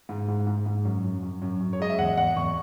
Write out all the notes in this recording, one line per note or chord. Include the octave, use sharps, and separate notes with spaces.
G#2
G#2
G#2
G#2
F#2
F#2
F#2
F#2
F#2
C#5
G#3 D#5
E5
E2 F#5
E2 F#5
E2 C#6